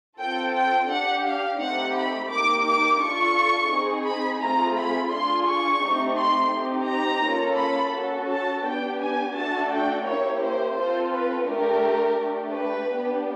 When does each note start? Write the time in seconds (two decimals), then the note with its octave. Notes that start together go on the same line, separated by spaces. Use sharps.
0.17 C4 F4 A4 G5
0.53 G5
0.88 D4 G4 F#5
1.24 F5
1.58 A3 C4 D#4 G4 F#5
1.94 B5
2.29 A#3 D#4 G4 D6
2.64 D6
3.00 D4 F4 A4 C#6
3.70 C4 D#4 G#4
4.06 B5
4.41 A3 C4 F4 G#4 A#5
4.76 B5
5.11 D4 F4 G#4 C6
5.47 C#6
5.82 A3 C4 D#4 G4
6.17 C6
6.52 C4 D#4 G4
6.88 A#5
7.23 A#3 C#4 F4 A4
7.58 B5
7.93 C#4 F#4 A4
8.29 A5
8.63 B3 D4 G4 G5
8.99 G#5
9.34 A3 D4 F#4 A4 A5
9.70 G5
10.05 A#3 C#4 E4 G4 C#5
10.41 C5
10.75 C4 F4 A4 C5
11.11 B4
11.46 A3 D4 G4 A#4
12.16 A3 D4 G4
12.52 B4
12.87 B3 D4 G4